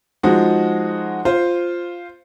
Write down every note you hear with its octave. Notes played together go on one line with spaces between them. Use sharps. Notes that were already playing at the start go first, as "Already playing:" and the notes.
F3 G#3 D#4 F#4
F4 C5